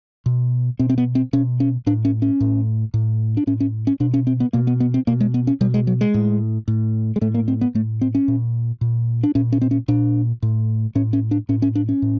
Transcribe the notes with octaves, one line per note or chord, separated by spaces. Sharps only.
B2
B2 C4
C4
B3
C4
B2 C#4
C#4
A2 D4
C#4
C#4
A2
A2
D4
A2 C#4
C#4
C#4
B2 D4
C#4
C4
B3
B2 A#3
B3
B3
C4
B2 A#3
G#3
B3
C#4
B2 G3
G#3
F#3
G#3
A2
A2
G#3
A2 A3
A#3
C4
B3
A2 A3
C4
C#4
A#2
A#2
D4
A#2 C#4
C#4
C4
C#4
A#2 D4
A2
A2 C#4
C#4
D4
A2 C#4
C#4
D4
C#4
A2